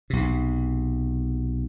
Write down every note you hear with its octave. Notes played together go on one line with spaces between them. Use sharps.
B1 C3